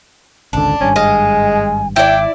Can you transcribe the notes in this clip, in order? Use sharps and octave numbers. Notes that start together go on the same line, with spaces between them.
G#1 C#2 D3 D4
G#1 G2 C#4 G#5
G#3 D#5 F5
G#1 E4 D5 E5 G5